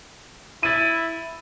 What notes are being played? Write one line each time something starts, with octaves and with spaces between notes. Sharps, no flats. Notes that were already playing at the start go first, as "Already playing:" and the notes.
E4 A6 D#7